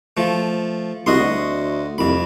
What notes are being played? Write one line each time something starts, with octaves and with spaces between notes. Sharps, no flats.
F3 A3
C2 F#4 D#5 C6
D2
C2 F2 B5